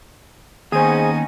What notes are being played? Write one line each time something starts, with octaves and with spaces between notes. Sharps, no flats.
D#2 B3 C#4 D#4 G#4 C5 G#5